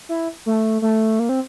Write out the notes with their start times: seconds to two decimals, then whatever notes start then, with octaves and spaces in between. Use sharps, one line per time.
0.09 E4
0.46 A3
0.82 A3
1.19 A#3
1.29 C4